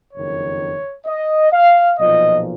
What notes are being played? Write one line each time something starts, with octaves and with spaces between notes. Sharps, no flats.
F#1 F2 D#3 C#5
D#5
F5
B1 A#2 F3 D#5